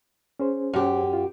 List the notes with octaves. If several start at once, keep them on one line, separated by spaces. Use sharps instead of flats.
C#4 G#4 C5
F#2 G4
F4